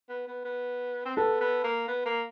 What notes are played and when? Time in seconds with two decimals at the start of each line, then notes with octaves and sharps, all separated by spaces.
0.09 B3
0.28 B3
0.45 B3
1.05 C4
1.16 B3 A4
1.41 B3
1.64 A#3
1.88 B3
2.06 A#3